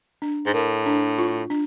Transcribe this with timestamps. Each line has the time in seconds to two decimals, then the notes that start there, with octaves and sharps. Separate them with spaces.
0.22 D4
0.47 G#2
0.54 A2 A#4
0.86 D4
1.18 F4
1.50 D4